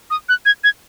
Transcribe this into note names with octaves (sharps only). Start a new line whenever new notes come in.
D#6
F#6
G#6
G#6